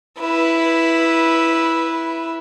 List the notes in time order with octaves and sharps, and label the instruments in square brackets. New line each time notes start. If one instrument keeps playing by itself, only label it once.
[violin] E4 B4